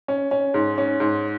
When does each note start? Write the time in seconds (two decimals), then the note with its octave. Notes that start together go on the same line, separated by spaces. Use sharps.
0.08 C#4
0.31 C#4
0.54 G#2
0.78 C#4
1.00 G#2